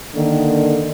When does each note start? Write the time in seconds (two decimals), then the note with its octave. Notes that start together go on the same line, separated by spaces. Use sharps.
0.15 D3 D#3 A#3